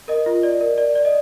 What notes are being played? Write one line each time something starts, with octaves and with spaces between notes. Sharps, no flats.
A#4 D#5
F4
D5
A#4
D5
D5
D#5